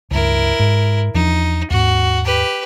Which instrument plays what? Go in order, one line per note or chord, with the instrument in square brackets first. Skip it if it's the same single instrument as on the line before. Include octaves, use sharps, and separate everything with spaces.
[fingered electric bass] C#2 G2 [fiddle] E4 A#4
[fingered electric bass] G#2
[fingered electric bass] E2 F3 D4 [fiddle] D#4
[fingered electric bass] D#2 G#2 [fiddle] F#4
[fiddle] G4 B4